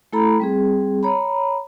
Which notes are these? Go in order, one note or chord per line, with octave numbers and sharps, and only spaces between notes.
A3 E4 A4 A#5 B5
G3 C4 G#4
C#5 A#5 B5